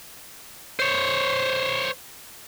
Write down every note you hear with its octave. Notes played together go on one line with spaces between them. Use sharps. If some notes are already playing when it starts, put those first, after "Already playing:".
C5 C#5